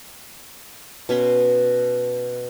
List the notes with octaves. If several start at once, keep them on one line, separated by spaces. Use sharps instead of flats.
B2 C#4 B5 C6